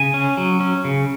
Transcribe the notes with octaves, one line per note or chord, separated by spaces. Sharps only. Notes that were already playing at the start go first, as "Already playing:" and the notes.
Already playing: C#3 G#5
C#4
F#3
C#4
C#3